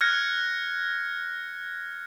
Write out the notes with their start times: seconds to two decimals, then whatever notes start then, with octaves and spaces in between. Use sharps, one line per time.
0.01 F6 F#6 G#6 A#6 C#7